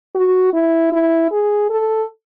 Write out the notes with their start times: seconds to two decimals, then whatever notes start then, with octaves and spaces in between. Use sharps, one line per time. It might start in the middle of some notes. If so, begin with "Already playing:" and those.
0.15 F#4
0.53 E4
0.92 E4
1.31 G#4
1.70 A4